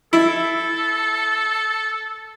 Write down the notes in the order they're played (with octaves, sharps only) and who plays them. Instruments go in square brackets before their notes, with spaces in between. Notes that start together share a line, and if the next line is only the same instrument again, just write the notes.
[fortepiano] E4 [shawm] A4